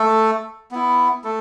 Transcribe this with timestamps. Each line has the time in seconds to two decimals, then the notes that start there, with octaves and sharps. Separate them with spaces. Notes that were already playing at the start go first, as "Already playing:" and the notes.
Already playing: A3 A4
0.71 B3 E4
1.24 A3 A4